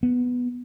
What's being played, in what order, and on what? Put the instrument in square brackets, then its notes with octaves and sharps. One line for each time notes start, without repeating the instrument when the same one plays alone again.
[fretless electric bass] B3